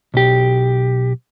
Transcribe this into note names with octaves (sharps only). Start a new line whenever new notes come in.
B1 G4